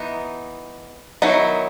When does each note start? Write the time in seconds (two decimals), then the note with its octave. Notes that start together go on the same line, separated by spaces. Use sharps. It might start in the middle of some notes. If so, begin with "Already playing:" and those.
Already playing: E3 B3 D#4
1.22 D#3 F#3 B3 D#4 E4